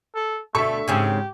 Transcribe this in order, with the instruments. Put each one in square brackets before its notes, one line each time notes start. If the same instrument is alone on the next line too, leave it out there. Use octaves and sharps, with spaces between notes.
[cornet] A4
[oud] D2 B2 A4 [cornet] A3 [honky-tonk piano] E5 C#6
[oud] G#2 C#3 C4 [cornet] G4